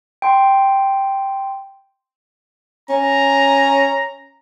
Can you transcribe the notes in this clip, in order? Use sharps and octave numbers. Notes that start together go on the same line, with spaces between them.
G5 C6
C#4 A#5